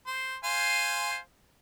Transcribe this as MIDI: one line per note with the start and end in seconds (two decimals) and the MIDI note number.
0.07 0.36 72
0.44 1.17 72
0.44 1.17 77
0.44 1.17 80